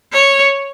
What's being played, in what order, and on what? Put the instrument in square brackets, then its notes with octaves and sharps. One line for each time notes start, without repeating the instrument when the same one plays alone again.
[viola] C#5